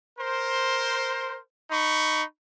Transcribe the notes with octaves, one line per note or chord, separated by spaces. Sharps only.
A#4 C5
D#4 B5 C#6